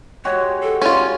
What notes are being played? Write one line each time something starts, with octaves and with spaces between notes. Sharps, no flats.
G#3 F#4 G4 C#5
A4
C#4 F4 C#5